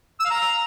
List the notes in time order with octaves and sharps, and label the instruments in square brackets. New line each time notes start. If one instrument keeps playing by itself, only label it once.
[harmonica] E6
F5
A#5